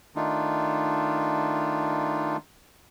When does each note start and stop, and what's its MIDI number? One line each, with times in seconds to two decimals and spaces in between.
0.16 2.37 51
0.16 2.37 57
0.16 2.37 62
0.16 2.37 63
0.16 2.37 65